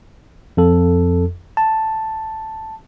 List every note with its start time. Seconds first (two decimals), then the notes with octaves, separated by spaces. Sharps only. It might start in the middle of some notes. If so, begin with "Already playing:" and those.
0.57 F2 A4
1.57 A5